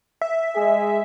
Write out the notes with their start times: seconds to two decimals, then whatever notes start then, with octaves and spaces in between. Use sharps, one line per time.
0.21 E5
0.56 G#3 G#4